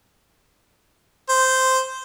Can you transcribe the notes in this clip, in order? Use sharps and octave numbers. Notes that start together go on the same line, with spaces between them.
C5